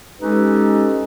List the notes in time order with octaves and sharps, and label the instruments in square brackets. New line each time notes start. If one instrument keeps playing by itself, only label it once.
[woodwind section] G#3 C#4 D#4 G4 A4 B4